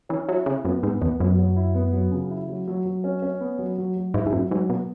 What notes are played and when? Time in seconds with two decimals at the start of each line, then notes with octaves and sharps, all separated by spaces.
0.09 E3 C#4
0.28 F#3 E4
0.46 C#3 E4
0.65 F#2 B3
0.83 G#2 B3
1.01 E2 B3
1.19 F#2 F#3
1.38 F#3
1.56 E4
1.75 B3
1.93 F#3
2.12 C#3
2.30 E4
2.48 F#3
2.68 F#3
2.85 F#3
3.04 C#4
3.22 C#4
3.41 B3
3.59 F#3
3.78 F#3
3.96 F#3
4.14 G#2 E4
4.26 G#2
4.32 F#2 F#3
4.51 G#2 F#3
4.69 B2 B3